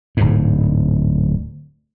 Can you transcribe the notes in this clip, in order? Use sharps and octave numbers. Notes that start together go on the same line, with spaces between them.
D1 G#2